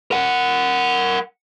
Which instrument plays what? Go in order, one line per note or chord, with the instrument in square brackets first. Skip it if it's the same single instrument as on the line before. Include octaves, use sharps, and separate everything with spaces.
[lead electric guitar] A#4 F#5